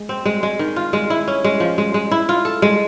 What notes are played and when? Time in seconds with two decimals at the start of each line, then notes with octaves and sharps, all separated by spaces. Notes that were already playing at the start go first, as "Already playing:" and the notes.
Already playing: G#3
0.09 C4
0.25 G#3
0.43 G#3
0.59 D#3
0.76 F4
0.93 G#3
1.10 E4
1.28 C#4
1.44 G#3
1.60 F3
1.78 G#3
1.94 G#3
2.11 E4
2.29 F4
2.45 A4
2.62 G#3